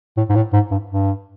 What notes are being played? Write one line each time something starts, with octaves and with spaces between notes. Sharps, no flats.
A2
G#2
A2
G#2
G2
G2